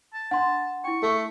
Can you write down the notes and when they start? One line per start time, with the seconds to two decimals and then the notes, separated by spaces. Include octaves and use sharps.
0.13 A5
0.31 D4 F#5 C6
0.84 E4 G5 C#6
1.03 A3 A4